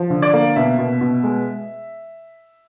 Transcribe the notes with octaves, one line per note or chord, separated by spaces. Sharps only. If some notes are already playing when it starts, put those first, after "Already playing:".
Already playing: F3
D3
D5
A#3
B2 E5
B2
B2
G#3